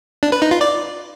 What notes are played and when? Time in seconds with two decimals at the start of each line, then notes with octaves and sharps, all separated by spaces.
0.23 D4
0.32 B4
0.42 D#4
0.51 F4
0.61 D5